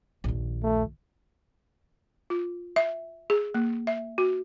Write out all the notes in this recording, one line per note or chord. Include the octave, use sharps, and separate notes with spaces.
A#1 D#2
A3
F4
E5
G#4
A#3
E5
F#4